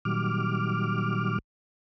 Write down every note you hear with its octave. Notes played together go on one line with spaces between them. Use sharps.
A#2 D#3 F#3 G3 D6 F6